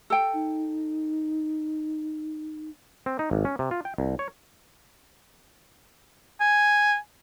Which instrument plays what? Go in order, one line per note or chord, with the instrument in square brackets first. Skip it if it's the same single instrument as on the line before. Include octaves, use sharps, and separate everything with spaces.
[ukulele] A4 G5
[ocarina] D#4
[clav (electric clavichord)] C4
D#4
G#1
C#4
C3
F4
G5
C2
C#5
[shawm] G#5